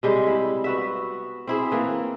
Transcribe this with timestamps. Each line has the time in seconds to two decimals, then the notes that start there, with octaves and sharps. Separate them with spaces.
0.03 C3 G3 G#3
0.27 E4
0.64 B3 F#4 E5
1.47 C4 E4 G#4
1.72 E3 A#3